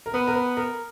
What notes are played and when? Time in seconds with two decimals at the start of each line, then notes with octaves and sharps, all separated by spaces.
0.06 A#4
0.14 B3 B4
0.27 A#4
0.35 B4
0.57 A#4